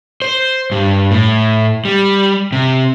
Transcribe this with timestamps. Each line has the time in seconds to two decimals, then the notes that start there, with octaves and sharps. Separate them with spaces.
0.22 C5
0.72 G2
1.11 A2
1.85 G3
2.52 C3